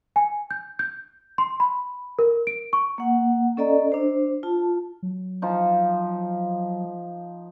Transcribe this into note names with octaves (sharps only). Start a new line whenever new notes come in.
G#5
G6
G6
C6
B5
A#4
D7
C#6
A#3 F#5
C#4 A4 D5 D#5 A#5
D4 C5
F4 A5
F#3
F3 D#4